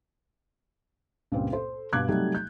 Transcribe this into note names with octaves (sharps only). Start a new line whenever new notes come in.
C#2 G2 A#2 A#3 C4
A4 C5
G2 B2 F5 D6 F#6 G#6
C3 F#3 G3 A3 D#4
G6